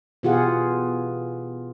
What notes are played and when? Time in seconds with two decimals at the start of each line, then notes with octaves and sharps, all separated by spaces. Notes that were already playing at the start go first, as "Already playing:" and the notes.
0.23 B2 E3 F4 G4 G#4 F#5